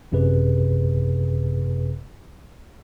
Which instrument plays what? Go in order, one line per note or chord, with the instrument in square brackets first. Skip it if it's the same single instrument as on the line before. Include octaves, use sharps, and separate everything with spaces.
[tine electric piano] G#1 F#2 C3 G#4 B4